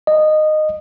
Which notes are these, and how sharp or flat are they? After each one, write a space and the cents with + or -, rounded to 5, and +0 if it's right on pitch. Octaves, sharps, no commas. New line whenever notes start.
D#5 -15